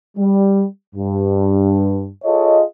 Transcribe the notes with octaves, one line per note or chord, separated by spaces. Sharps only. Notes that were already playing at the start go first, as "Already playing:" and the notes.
G3
G2
F4 G#4 A4 C#5 D#5